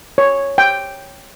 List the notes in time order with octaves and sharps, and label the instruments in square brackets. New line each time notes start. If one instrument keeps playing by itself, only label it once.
[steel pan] C#5
G5